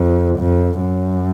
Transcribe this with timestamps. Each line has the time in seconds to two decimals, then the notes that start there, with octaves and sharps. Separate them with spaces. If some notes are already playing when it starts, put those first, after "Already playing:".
Already playing: F2
0.39 F2
0.79 F#2